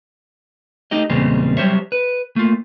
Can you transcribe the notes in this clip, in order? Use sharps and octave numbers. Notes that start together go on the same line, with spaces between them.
A3 D#4 G4 D#5
E2 A#2 C#3 G3 G#3 C4
F#3 G3 G4 C5 C#5 E5
B4
A3 A#3 F4